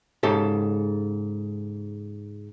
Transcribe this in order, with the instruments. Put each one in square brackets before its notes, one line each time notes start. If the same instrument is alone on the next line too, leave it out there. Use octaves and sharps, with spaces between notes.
[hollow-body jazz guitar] G#2 C#3 G4 A4 C#5